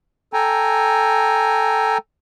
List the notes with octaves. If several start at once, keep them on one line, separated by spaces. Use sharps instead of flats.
A4 G5 G#5 A#5